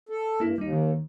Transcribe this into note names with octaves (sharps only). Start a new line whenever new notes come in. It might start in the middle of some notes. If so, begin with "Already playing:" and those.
A4
G2 A#3 E4
D#2 G3 D#4
D#3